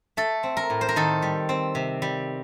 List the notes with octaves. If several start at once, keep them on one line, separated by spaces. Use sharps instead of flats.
A3 A4
C4
A#4
A2
C5
A#4
D#3 A4
G3
C4
C3
G3